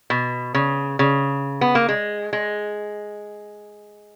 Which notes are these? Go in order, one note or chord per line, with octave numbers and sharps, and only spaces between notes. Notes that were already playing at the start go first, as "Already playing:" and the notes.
B2
C#3
C#3
B3
A#3
G#3
G#3